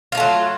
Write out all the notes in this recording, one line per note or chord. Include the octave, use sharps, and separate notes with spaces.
F#3 A3 A#3 F4